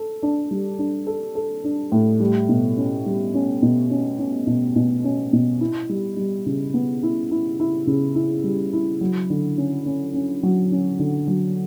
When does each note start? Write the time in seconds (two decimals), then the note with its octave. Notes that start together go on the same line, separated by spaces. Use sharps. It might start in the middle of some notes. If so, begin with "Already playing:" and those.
Already playing: A4
0.23 D4
0.51 G3
0.79 D4
1.07 A4
1.35 A4
1.64 D4
1.92 A2
2.20 G3
2.49 B2
2.77 C#4
3.06 G3
3.34 C#4
3.62 B2
3.91 C#4
4.19 C#4
4.47 B2
4.76 B2
5.04 C#4
5.33 B2
5.61 E4
5.89 G3
6.17 G3
6.46 C#3
6.74 B3
7.03 E4
7.31 E4
7.60 E4
7.87 C#3
8.15 E4
8.44 G3
8.73 E4
9.01 F#3
9.30 D3
9.58 C#4
9.86 C#4
10.14 C#4
10.43 F#3
10.72 C#4
10.99 D3
11.28 F#3